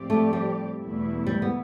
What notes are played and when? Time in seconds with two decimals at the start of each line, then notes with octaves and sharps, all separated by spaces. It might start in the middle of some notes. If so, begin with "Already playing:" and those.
Already playing: A2 F3 C4 G4 D5
0.10 A3
0.33 G3
0.79 E2 B2 A3 E4
1.27 G3
1.42 B3